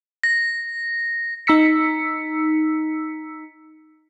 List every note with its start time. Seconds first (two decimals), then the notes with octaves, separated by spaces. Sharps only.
0.24 A#6
1.47 D#4 A#5 E6 B6 C#7